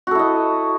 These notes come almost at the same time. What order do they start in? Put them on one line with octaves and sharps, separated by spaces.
F#4 A4 E4 D#5